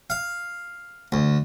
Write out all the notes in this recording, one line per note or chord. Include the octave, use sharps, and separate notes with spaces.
F5
D2